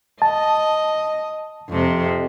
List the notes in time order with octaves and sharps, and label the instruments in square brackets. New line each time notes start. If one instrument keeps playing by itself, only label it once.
[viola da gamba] D#5 [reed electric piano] A5
[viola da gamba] F2 C3